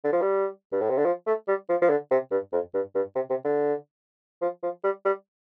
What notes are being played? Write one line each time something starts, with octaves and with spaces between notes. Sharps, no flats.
D3
F3
G3
G2
A2
C3
D3
F3
A3
G3
F3
F3
D3
C3
G2
F2
G2
G2
C3
C3
D3
F3
F3
G3
G3